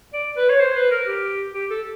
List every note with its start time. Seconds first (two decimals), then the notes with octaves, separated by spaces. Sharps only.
0.13 D5
0.37 B4
0.49 C#5
0.60 C5
0.76 B4
0.91 A#4
1.08 G4
1.54 G4
1.70 A4